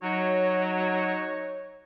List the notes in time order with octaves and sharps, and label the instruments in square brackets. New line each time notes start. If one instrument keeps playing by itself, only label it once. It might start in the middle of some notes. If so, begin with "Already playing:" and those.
[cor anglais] F#3 [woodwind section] D#4 F#4 C#5